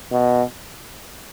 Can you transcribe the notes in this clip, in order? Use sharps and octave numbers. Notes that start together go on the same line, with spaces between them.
B2